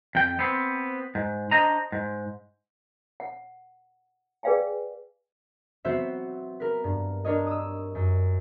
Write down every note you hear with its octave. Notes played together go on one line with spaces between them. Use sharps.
F2 G5
B3 C4
G#2
D4 C5 D#5 A#5
G#2
F#5
G#4 B4 D5 F5 G5 G#5
F#3 B3 C4 F#4 C5 E5
A#4 B4
G2
D4 A#4 C#5 D#5
D#6 E6
F#2